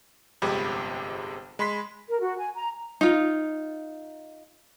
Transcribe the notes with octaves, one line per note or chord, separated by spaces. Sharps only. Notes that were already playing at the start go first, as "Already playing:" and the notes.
G1 F2 C3 G#3 G4 B5
G#3 B5 C6 B6
A#4
F#4
G#5
A#5
D#4 F4